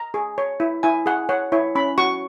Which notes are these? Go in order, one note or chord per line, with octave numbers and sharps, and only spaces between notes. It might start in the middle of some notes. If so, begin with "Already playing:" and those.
Already playing: A#5
G#4
C#5
E4
E4 G#5
G#4 F#5
C#5 F#5
E4 C#5
C#4 B5
F#4 C#6